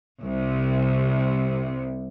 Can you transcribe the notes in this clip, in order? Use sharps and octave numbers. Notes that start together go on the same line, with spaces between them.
C2 C3